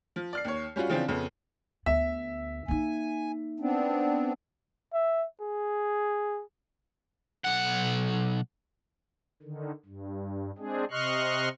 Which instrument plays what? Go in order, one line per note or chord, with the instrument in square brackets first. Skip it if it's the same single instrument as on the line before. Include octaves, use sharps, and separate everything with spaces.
[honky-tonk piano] F3
D5 F6 C7
D#2 C#5
G3 C#4 F4 F#4
C#3 E3 F3 C4 D4 F4
F2 C#3 B3
[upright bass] D2 B3 [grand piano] E5
[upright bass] A#3 D#4 [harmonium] G#5
[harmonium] B3 C4 D4
[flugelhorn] E5
G#4
[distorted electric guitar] B1 F#5
[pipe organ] D3 D#3
G2
G#3 C4 D4 G#4
C3 D#5 C6 C#6 F6 F#6